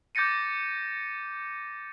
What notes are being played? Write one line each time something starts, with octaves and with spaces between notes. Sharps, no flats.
D6 G6 A6 A#6 C#7 D#7